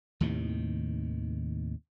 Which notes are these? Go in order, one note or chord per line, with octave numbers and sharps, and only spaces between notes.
D#2 A2 C3 D#3